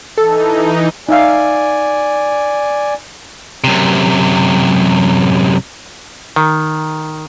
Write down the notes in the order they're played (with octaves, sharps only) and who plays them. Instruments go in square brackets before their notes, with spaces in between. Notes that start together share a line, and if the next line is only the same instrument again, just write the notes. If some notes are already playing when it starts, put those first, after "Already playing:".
[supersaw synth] E3 D#4 [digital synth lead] A4
[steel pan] D#4 E5 F5 [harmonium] D5 G#5
[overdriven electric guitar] F#2 C3
[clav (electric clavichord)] D#3